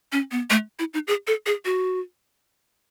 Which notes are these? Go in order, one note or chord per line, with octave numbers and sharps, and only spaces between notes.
C#4
B3
A3
E4
D#4
G#4
A4
G#4
F#4